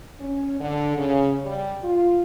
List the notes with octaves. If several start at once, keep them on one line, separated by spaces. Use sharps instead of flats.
C#4
D3
C#3
G3
F4